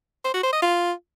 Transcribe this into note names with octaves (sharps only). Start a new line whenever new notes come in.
C5
F#4
C5
D#5
F4